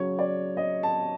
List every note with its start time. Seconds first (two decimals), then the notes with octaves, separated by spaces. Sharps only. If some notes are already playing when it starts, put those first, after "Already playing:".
Already playing: C#3 F#3 C#5
0.19 D5
0.57 D#5
0.83 A5